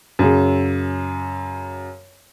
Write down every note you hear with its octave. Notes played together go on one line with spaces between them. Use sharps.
F#2 C#3